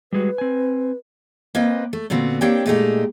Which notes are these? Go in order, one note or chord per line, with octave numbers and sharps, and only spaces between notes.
G3 G#3 F#4 B4
C4 G#5
A#3 C4 B4 D#5 G5
A3
A#2 D3 B3 C4 F#4
A#3 C4 D4 G4 C#5 G5
A#2 G#3 A3 B3 D#4 G4